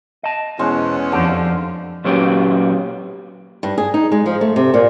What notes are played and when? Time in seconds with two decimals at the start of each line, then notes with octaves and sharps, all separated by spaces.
0.23 D#5 A5
0.59 E2 B2 G#3 C#4 C5
1.12 F2 D3 F3 D#4 G4 A4
2.05 A#2 F#3 B3 C#4 G4
3.63 G2
3.78 G#4
3.94 D#4
4.12 G#3
4.26 F3
4.41 A3
4.56 C3
4.74 A#2